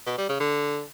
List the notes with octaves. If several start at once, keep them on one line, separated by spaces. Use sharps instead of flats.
B2
G3
C#3
D3